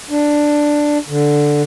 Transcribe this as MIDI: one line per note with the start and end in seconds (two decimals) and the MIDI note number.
0.10 0.98 62
1.08 1.62 50